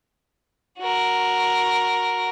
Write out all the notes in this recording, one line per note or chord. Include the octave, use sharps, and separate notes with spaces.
F#4 A#4